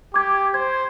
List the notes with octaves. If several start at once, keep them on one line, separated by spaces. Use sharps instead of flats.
G4 D6 G#6
C5 G#6